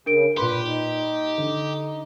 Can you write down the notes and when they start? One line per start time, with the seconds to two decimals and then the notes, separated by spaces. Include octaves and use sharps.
0.06 C#3 D4 A#4 D7
0.37 A#2 G4 B4 B5 C6
0.65 D#4
1.38 D3